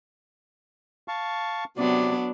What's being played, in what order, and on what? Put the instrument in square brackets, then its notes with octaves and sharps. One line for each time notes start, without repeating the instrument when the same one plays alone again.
[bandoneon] F5 A5 C#6
[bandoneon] C3 D5 [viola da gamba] F#3 B3 D4